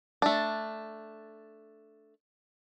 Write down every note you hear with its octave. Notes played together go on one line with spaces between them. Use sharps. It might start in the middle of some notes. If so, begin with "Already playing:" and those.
A3 D4